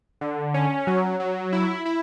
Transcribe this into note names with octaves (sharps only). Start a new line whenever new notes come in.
D3
C#4
F#3
F#3
E4
E4